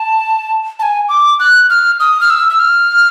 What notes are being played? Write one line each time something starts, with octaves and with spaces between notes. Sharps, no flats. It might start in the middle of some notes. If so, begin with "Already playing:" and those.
Already playing: A5
A5
G#5
D6
F#6
F6
D#6
F6
E6
E6
F6